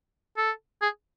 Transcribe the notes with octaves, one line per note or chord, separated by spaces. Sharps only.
A4
G#4